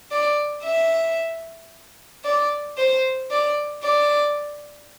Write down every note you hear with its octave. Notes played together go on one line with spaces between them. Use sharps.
D5
E5
D5
C5
D5
D5